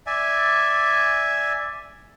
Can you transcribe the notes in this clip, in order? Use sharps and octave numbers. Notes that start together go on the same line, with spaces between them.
D5 E5 G#5